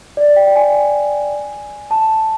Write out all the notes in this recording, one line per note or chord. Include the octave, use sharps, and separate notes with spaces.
D5
G5
G5
G#5
A5